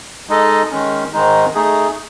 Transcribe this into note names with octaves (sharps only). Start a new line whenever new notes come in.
G#3 D#4 A4 D#5
D#3 G#3 C#4
G#2 D#3 G#3 D#4
A3 D#4 G#4